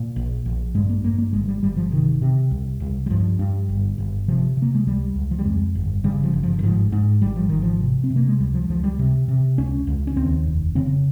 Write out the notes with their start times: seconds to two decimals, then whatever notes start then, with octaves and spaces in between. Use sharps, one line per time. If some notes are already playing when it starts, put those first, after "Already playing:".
Already playing: A#2
0.16 A#1
0.46 A#1
0.74 G2 G#3
0.89 A#3
1.04 G2 A#3
1.18 A#3
1.33 G1 G#3
1.48 G3
1.63 G1 G3
1.77 F3
1.92 C3 D#3
2.22 C3
2.51 C2
2.80 C2
3.06 G3
3.10 G2 F3
3.39 G2
3.69 G1
3.98 G1
4.28 C3 F3
4.57 C3 A#3
4.75 G#3
4.87 C#2 G3
5.15 C#2
5.31 F3
5.39 G3
5.45 F2 G#3
5.75 G1
6.04 C#3 G3
6.24 F3
6.33 G1
6.43 F3
6.59 D#3
6.63 G#2 F3
6.92 G#2
7.22 G#1 G3
7.36 F3
7.49 G#1 D#3
7.62 F3
7.81 C3
8.04 C4
8.10 C3
8.16 A#3
8.28 G#3
8.40 C#2 G3
8.54 F3
8.69 C#2 F3
8.84 G3
8.99 C3
9.28 C3
9.58 C#2 C#4
9.87 C#2
10.07 C#4
10.16 D#2 C4
10.46 F1
10.75 C#3 C4